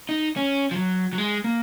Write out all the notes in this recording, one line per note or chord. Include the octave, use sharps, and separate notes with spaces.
D#4
C#4
F3
F#3
F#3
G#3
A#3